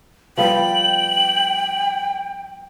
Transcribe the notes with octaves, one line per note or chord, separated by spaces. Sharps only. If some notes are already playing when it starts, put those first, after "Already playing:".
F3 G3 B3 G5 F#7